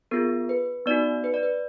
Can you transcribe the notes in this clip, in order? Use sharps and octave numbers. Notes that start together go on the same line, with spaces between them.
B3 F4 G#4 A#4
B4
B3 D#4 F#4 D5
B4
D5
B4